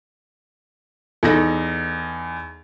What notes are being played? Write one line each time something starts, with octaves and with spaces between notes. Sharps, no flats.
E2 D#4 A4 A#6